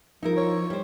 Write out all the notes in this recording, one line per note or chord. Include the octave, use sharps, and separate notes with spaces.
F3 D#4 E4 A#4
C#5
G3 C5